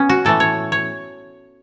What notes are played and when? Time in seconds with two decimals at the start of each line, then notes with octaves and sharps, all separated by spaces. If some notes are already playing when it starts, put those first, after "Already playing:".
Already playing: B3 C#4
0.09 F#4
0.25 A2 E3 A3 A4
0.40 C#5
0.72 C#5